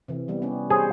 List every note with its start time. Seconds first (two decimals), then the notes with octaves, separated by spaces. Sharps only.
0.08 C3 E3
0.28 E3 G3 B3
0.42 B3 C#4 G4
0.70 G3 G#4 C5 C#5